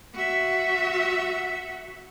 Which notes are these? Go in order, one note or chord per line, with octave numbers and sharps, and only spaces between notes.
F#4 E5